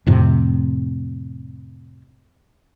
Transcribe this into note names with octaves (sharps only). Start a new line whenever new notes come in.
F2 A2 C3